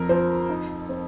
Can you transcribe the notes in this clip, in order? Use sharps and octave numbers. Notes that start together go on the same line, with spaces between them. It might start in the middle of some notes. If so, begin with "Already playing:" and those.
Already playing: F2 A#4
F3 C5
D#4
C4